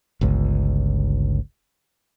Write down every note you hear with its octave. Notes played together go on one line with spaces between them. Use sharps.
G1 C#2